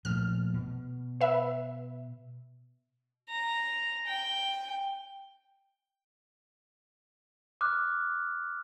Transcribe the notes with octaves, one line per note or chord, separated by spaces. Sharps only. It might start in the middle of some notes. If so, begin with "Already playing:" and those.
A#2 F3 A3 F6
B2
B4 E5
A#5
G5
D6 F6 F#6